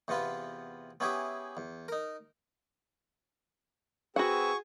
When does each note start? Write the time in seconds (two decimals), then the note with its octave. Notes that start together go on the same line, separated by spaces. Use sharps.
0.08 E2 C3 B3 F4 B4
1.00 B3 C#4 E4 G4 G#4 E5
1.57 E2
1.88 D#4 A#4
4.16 C4 F#4 G#4 B4 F#5 C#6 E6